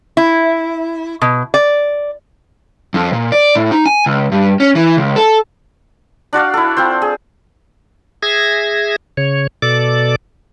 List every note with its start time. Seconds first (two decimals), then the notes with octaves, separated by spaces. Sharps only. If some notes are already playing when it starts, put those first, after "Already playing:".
0.17 E4
1.22 B2
1.54 D5
2.94 F2
3.13 A#2
3.32 D5
3.55 A2
3.71 D#4
3.86 G#5
4.06 C#2
4.32 G2
4.60 C#4
4.75 E3
4.97 C#2
5.16 A4
6.33 D4 F#4 D5 F5
6.54 E4 A4
6.77 C4 F4 C5
7.02 G#4
8.23 G#4 E5 G#6 A#6
9.17 C#3 C#5
9.62 B2 A4 D5 D6